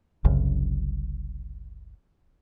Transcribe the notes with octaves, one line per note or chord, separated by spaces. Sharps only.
F#1 C2 F#2 C#3